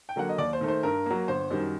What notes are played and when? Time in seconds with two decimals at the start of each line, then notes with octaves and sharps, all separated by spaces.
0.09 G5
0.16 D3 F#3 A#3 F#5
0.29 D#5
0.38 D#2 D5
0.53 C5
0.61 D#3 A3
0.68 C5
0.83 G2 A#4
1.06 F#3 A#3
1.28 G1 C5
1.51 F#2 D#3 G3